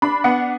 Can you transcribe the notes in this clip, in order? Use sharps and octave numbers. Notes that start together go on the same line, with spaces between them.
D4 B5
B3 F#5